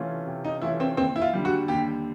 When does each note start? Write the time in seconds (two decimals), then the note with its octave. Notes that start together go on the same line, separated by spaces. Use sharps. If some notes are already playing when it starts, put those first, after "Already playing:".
Already playing: C3 E3 A3 C#4 F4
0.27 C3
0.44 D#4
0.62 E3 A3 C#4 E4 F4
0.80 C4
0.97 D#2 C4
1.16 E4
1.21 F4
1.33 D3 G3
1.45 F#4
1.68 D#2 G4